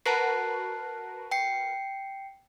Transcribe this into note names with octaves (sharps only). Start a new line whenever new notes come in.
F#4 A#4 B4 A5 F#6 C7
G5 C7 C#7